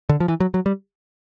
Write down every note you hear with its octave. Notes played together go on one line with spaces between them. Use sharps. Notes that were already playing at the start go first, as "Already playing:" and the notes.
D3
F3
E3
F#3
F#3
G3